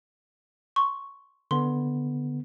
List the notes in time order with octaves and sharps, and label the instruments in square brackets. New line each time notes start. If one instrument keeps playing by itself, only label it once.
[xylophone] C6 C#6
[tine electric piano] D3 B3 [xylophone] C6